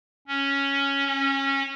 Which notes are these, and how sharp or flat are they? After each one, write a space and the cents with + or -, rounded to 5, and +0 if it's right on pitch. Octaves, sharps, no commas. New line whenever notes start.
C#4 +0
C#4 -20